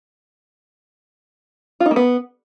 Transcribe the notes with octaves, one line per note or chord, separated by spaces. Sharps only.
F4
D#4
A#3
B3